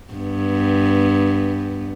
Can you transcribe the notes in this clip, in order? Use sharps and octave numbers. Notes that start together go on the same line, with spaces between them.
G2 B3